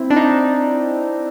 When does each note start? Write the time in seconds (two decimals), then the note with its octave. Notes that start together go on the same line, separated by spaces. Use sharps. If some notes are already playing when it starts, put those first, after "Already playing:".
Already playing: C4 E4
0.10 D4
0.16 D#4